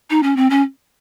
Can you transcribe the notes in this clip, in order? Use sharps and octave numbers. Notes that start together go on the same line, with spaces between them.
D#4
C#4
C4
C#4